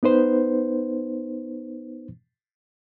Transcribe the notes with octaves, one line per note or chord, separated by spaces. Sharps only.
B3 D#4 B4 C5